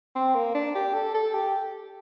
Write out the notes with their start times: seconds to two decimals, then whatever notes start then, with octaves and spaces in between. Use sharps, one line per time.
0.16 C4
0.35 A#3
0.55 D4
0.75 G4
0.94 A4
1.15 A4
1.34 G4